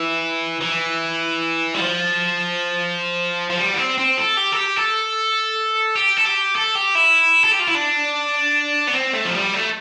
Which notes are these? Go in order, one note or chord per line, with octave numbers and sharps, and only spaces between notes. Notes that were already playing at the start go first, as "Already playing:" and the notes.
Already playing: E3
E3
G3
F3
F3
G3
B3
C4
C4
A4
G4
A4
G4
A4
G4
A4
G4
A4
G4
E4
A4
G4
F4
E4
D4
B3
C4
A3
F3
G3
A3